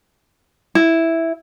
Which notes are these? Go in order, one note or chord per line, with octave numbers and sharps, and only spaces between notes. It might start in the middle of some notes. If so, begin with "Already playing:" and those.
E4